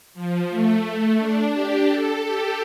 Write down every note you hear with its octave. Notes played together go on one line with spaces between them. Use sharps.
F3
A3
D4
G4
A4
G4